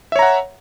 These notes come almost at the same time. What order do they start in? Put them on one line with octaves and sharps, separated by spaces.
E5 C#5 A#5 F#5